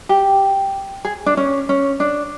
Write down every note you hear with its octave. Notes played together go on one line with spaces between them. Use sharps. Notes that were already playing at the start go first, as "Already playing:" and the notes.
G4
G#4
D4
C#4
C#4
D4